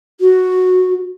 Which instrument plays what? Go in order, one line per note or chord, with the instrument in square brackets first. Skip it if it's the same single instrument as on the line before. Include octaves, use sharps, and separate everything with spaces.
[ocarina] F#4